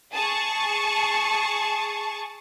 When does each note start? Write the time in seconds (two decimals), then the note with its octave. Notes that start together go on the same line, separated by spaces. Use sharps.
0.13 G#4 A5 C#6